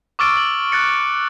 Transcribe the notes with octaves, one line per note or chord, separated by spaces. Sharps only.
C#6 D6 E6 F6 A6 D7
F#7
F#6 A6 C#7